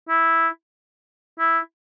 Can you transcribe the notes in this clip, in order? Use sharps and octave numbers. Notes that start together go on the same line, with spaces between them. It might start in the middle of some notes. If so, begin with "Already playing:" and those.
E4
E4